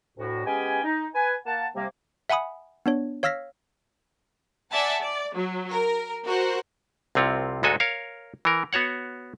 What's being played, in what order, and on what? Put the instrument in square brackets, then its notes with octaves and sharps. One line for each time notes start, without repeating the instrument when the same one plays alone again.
[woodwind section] D2 A2 F#4
G#3 B3 C#4 G4 G5 G#5
D#4
B4 G#5
A#3 F#5 A5
C3 G3 A#3
[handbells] E5 F#5 G#5 B5 D#6
B3 D4 C#5
C#5 F5 E6 F6 A#6 B6
[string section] D5 E5 F#5 G#5 A5
D5
F#3
A#4
F#4 A#4 C5 F#5
[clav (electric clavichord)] C2 C3 C4 F4 C#5
D2 G#2 G#3 F#4 A4 G#5
A#4 C#5 F5
E3 A#4
B3 F#4 C#5 F#5